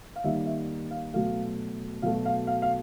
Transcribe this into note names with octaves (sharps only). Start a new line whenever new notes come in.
F5
D#3 G3 A#3 E5
E5
F5
B2 F#3 A3 F5
B2 F#3 A3 F5
F5
F5
F5